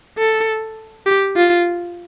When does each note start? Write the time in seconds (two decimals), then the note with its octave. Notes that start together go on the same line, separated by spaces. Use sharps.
0.18 A4
1.06 G4
1.36 F4